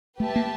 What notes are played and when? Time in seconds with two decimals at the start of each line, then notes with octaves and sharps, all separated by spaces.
0.20 A3 G4 B4 E5 A5
0.36 A#3